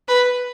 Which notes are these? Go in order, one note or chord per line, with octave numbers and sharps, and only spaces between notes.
B4